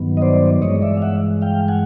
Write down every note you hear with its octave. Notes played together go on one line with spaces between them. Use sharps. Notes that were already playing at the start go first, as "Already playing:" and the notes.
Already playing: G2 D#3 F#3 B3
D#5
C5 D5
G2 E3 G#3 C#5 D#5
D5 E5
F5
E5 F#5
F5 G5
F#5 G#5